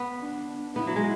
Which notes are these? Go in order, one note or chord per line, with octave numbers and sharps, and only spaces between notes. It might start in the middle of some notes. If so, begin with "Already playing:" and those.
Already playing: B3
D4
B3 E4
F#3
G#3